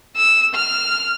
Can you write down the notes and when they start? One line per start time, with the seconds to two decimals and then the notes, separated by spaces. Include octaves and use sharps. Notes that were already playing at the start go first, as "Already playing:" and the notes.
0.16 E6
0.55 F6